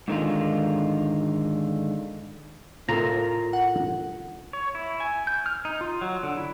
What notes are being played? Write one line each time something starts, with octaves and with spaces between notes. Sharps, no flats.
G#2 D3 D#3 G#3 F4
A2 F4 A4 A#4 A#5
F#5
C#5
E4
G#5
G6
F6
D#4
F4
F#3
D3
E4